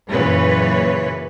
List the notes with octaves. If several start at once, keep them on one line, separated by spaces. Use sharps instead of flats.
F#2 A#2 C#3 E3 B4 C#5